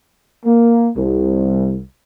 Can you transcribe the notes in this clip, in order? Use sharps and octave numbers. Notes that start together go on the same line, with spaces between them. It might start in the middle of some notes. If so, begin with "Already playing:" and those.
A#3
C2